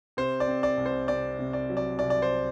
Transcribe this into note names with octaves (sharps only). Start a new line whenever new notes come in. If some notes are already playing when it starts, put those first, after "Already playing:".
C3 C5
D5
C4
D5
C2
C5
C3 D5
C3
D5
F#3
D5
C2 D5
D5
C5